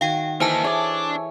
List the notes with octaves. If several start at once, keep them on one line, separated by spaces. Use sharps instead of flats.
D#3 F#4 F5 G5 G#5
E3 A#3 D#4 A4 C5 E5 G#5 A5
D4 G#4 C#5 D5